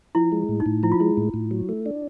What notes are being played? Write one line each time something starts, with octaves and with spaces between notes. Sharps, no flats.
F3 E4
G#3
A2
D#4
A2
F3 E4
F4
G#3 E4
A2
A2
F#3
A3
D4